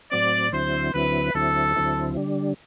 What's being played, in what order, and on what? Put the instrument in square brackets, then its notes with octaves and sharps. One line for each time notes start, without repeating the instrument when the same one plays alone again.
[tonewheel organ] A2 F#3 C4 [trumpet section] D5
[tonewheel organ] D2 D3 F#3 C4 E4 [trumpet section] C5
[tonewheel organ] D2 D3 F#3 C4 E4 [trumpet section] B4
[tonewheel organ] D2 D3 F#3 C4 E4 [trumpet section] A4
[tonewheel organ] D2 D3 F#3 C4 E4
D3 G3 D4